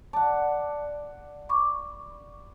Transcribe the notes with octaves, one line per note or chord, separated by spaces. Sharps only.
D5 F#5 A5
B5 C#6 D6